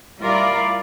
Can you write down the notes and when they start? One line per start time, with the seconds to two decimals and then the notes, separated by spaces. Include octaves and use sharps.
0.19 G3 E4 F4 A#4 D5 F5